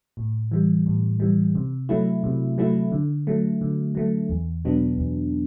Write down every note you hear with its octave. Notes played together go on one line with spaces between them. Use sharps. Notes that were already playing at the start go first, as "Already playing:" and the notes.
A2
E3 G3
A2
E3 G3
C3
F#3 A3 E4
C3
F#3 A3 E4
D3
F#3 A3
D3
F#3 A3
E2
B2 F#3 B3 D4
E2